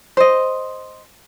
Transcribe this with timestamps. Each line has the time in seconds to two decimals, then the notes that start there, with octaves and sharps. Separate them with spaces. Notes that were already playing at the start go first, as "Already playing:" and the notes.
0.17 C5 D#5